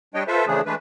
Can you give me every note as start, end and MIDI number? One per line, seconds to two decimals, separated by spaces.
0.14 0.23 55
0.14 0.23 62
0.14 0.23 73
0.14 0.23 75
0.14 0.23 79
0.27 0.45 65
0.27 0.45 69
0.27 0.45 71
0.27 0.45 72
0.27 0.45 76
0.47 0.61 49
0.47 0.61 52
0.47 0.61 53
0.47 0.61 57
0.47 0.61 62
0.47 0.61 68
0.66 0.75 52
0.66 0.75 56
0.66 0.75 57
0.66 0.75 62
0.66 0.75 71